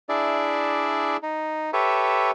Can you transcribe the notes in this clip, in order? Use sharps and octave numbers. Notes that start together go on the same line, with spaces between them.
D4 E4 G#4 D5 E5
D#4
G4 A4 B4 C#5 E5